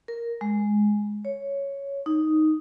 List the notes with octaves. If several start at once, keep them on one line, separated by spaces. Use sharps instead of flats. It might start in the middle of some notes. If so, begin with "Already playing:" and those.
A#4
G#3
C#5
D#4